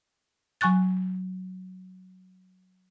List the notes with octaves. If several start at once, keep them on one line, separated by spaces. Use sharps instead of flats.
F#3 G#5 C#6 F#6 A6